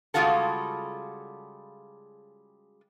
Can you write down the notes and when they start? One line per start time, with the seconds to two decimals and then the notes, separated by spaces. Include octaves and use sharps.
0.14 C#3 G3 G#3 F4 F#4 A4